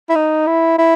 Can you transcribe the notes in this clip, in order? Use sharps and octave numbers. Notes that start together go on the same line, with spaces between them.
E4
D#4
E4
E4